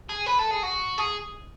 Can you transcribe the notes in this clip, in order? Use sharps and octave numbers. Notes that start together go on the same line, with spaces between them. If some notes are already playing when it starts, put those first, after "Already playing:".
G#4
B4
A4
G#4
F#4
G#4